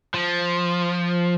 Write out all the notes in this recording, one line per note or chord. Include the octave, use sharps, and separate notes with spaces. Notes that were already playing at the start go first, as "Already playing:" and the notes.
F3